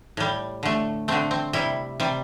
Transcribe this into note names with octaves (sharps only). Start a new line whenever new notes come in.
A2 G3
D3 A3
D3 A3 C4
C4
C3 G3 E4
C3 G3